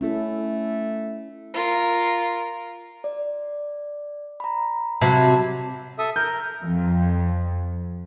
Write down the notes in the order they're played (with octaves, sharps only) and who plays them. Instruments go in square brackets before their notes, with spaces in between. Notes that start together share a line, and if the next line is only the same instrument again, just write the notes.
[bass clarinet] A3 [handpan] C#4 E4 A4
[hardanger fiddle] F4 A#4
[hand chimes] D5
A#5 B5
[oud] C3 F#3 [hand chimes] A5 B5
[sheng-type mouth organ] A4 E5 D#6
[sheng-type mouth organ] A#4 [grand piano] G6
[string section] F2